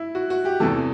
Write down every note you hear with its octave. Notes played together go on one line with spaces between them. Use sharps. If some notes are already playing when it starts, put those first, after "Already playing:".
Already playing: E4
F#4
F#4
G4
E2 C3 E3 A4